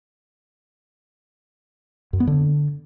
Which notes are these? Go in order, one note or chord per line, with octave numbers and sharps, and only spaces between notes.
F#2
B3
D3